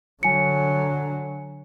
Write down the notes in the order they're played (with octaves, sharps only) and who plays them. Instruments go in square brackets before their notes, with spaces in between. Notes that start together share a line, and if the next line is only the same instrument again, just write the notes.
[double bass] D3 F#3 [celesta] G#5 C#7